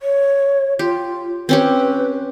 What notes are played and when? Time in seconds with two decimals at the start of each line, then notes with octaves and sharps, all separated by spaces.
0.01 C#5
0.79 F4 G4
1.49 C4 C#4 G4 B4